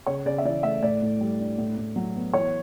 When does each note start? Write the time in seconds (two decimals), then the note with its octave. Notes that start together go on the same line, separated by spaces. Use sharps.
0.06 C#3 C#5
0.25 C#3 D5
0.38 E5
0.45 E3 D5
0.63 A3 E5
0.83 A2 D5
1.02 A2
1.21 G3
1.40 D4
1.58 A2
1.77 A2
1.96 F#3
2.16 B3
2.34 E3 C#5